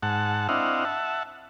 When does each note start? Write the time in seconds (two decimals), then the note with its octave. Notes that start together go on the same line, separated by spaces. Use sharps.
0.03 G#2 F#5 A5
0.49 C4 D4 E4 D#5 F5 F#5
0.85 E5 F#5 A5